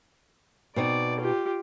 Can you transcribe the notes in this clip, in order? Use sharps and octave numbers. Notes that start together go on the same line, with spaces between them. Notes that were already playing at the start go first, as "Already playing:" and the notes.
B2 C4 D#4 D5
F4 G4